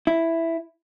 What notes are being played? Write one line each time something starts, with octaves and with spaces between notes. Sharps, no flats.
E4